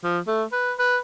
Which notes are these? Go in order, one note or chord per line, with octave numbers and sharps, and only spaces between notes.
F3
A3
B4
B4